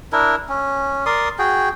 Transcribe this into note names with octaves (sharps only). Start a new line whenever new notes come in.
D4 E4 A#4
C#4
A#4 D5 C6 D#6
F#4 G#4 G5